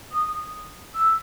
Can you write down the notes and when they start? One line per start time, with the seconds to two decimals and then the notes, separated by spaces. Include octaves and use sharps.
0.12 D#6
0.95 E6